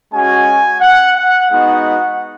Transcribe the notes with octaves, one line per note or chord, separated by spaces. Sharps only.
G#3 C#4 F#4 G#5
F#5
F#5
G#3 B3 D#4 F#4 F#5